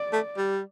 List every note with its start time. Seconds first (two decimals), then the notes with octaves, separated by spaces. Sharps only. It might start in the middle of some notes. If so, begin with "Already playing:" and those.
Already playing: D5
0.13 A3
0.37 G3